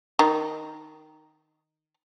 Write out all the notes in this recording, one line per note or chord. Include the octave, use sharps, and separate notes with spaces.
D#3 D#4